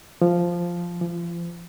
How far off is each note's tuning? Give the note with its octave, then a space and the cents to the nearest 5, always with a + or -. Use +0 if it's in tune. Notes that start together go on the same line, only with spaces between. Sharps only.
F3 -5
F3 -35